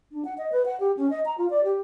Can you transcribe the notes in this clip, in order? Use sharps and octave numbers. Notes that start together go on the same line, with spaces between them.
D4
F#5
D#5
B4
F#5
G4
C#4
D#5
A#5
F4
D5
G4